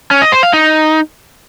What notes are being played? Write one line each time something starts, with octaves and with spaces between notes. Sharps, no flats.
C#4
D#5
C5
F5
D#4